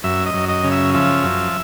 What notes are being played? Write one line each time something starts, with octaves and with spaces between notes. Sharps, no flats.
F#2 E5
D#5
F#2
D#5
C#3
E5
F3 E5
F#2